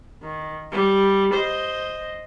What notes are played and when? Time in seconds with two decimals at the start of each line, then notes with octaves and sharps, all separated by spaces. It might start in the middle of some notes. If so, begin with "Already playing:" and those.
0.22 D#3
0.71 G3
1.34 C5 D#5